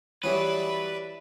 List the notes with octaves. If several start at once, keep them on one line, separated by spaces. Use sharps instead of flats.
E3 F#3 G3 C#4 G#4 B4 D5 E5